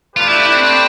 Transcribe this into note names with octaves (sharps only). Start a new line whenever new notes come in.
A3 D4 F4 G4 B4
E4
E4
C4
C4